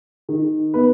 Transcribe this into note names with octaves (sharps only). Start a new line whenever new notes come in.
D#3
B3 B4